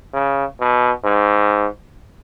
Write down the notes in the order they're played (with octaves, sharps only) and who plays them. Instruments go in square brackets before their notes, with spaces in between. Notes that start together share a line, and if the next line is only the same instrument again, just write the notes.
[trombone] C#3
B2
G#2